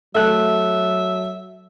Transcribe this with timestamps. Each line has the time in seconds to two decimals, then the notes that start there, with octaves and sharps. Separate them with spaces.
0.15 F#3 A3 A4 E5 F#6